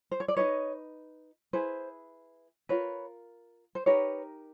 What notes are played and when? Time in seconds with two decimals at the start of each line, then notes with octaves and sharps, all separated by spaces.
0.11 C5
0.20 C#5
0.28 D5
0.37 D#4 G#4 B4 C#5 D#5
1.53 E4 G#4 B4 C5
2.69 F4 A#4 B4 C#5
3.75 C5
3.86 D#4 G4 A#4 B4 C#5